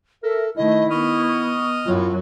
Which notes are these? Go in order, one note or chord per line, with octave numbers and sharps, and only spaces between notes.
A4 A#4 E5
D#3 A3 E4 D#5
B3 D#5 C#6 D#6 F6
C#6
F#2 A2 F#3 F4